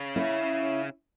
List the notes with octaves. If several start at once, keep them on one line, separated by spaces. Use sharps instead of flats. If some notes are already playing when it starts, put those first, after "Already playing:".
Already playing: C#3
C#4 E4